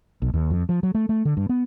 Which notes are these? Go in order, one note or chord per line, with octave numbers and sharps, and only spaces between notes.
B1
D#2
F2
F3
F#3
A3
A3
D3
G2
B3